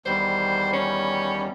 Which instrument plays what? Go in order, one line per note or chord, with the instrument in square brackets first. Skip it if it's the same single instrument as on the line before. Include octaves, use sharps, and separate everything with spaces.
[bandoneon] E2 D#3 G3 [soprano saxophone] C5
[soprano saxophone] C#4